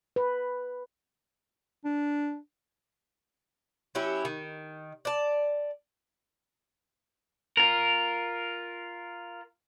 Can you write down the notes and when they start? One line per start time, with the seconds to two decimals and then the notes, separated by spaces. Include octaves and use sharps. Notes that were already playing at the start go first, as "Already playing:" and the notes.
0.16 B4
1.85 D4
3.95 F#3 C#4 E4 G4
4.25 D#3
5.05 D5 A5
7.57 F4 A#4